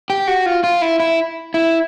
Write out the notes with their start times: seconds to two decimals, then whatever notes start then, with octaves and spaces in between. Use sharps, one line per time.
0.10 G4
0.27 F#4
0.46 F4
0.64 F4
0.82 E4
1.00 E4
1.54 E4